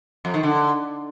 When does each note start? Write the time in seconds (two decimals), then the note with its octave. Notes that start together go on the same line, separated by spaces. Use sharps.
0.25 F2
0.34 D#3
0.43 D3